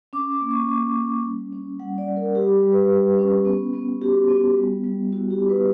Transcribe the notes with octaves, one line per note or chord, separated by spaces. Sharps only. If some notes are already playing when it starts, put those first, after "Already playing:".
C#4 D6
D6
A#3
C#6
A#3 D6
C#4
G3
C#4
G3 F#5
D5
G3
A#4
G3 G4
G3
B4
G3
C#4
B3
B3
F#4 G4
B3
G3
G3
E4 F#4
G4
E4
B4